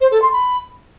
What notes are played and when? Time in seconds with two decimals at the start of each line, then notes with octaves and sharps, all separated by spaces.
0.01 C5
0.11 A4
0.22 C6
0.32 B5